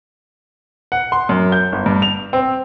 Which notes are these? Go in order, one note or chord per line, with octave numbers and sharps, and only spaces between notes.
F#5
C6
F#2
G6
G1
G2
F7
C4